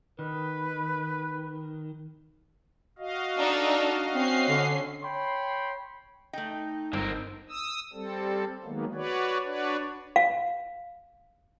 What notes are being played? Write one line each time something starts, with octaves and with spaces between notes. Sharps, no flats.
D#3 B4
F#4 D#5 F5
D4 D#4 A4
C4 C#4 C7
D3
C#5 G5 B5 C6
A3 D#4 G5
G1 D3 C4 A#4
D#6 E6
G3 C4 A4
D#3 F#3 G#3 A#3 B3
F#4 B4 C#5 D5
D4 F#4 B4 C#5 D5
F5